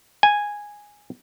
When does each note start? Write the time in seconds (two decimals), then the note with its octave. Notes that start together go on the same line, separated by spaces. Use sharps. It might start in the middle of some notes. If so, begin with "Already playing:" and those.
0.23 G#5